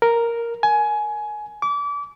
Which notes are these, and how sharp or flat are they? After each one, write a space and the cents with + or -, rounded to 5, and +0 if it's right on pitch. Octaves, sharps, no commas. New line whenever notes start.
A#4 +0
G#5 +20
D6 -30